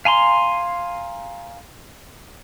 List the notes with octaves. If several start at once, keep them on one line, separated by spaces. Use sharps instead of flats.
F5 G#5 A#5 C6